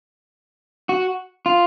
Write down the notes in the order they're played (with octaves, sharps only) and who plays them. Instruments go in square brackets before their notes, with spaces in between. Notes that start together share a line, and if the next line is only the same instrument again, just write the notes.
[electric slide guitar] F#4
F4